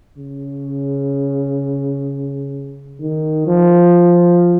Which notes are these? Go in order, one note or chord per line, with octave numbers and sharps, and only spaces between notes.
C#3
D#3
F3